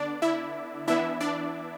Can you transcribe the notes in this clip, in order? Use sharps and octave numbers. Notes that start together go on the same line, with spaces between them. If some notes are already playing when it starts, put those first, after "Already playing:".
Already playing: D3 B3 D4 D5
E4 E5
E3 B3 D4 E4 E5
D4 D5